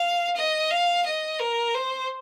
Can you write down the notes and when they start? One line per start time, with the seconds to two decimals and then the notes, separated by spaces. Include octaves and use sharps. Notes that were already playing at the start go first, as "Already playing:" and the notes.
Already playing: F5
0.36 D#5
0.70 F5
1.05 D#5
1.39 A#4
1.74 C5